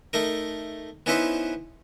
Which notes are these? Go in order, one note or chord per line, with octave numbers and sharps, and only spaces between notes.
A3 D#4 A#4
B3 C#4 D#4 E4 B4 C5